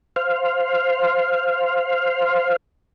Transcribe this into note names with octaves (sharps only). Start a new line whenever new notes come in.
C5 F5